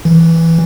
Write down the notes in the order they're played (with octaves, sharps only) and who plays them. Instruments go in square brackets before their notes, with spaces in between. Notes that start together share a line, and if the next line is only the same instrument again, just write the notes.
[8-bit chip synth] E3